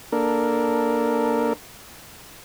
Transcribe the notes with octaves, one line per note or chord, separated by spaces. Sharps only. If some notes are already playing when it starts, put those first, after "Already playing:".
A#3 D4 A4 A#4